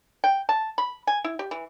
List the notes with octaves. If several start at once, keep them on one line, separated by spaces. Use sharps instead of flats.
G5
A5
B5
G#5
E4
G4
E3